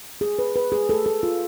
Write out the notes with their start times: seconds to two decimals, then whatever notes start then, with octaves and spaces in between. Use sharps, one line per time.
0.21 G#4
0.39 B4
0.56 B4
0.72 G#4
0.89 A4
1.06 A4
1.23 F4